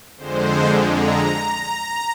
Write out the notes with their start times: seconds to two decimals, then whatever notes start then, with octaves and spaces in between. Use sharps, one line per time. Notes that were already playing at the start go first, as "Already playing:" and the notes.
0.17 F2 D3 G#3 C5
0.89 A#5